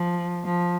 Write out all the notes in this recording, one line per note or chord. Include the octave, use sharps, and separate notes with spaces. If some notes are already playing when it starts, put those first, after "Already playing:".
Already playing: F3
F3